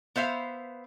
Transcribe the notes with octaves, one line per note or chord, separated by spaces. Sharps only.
B3 C5 E5 F5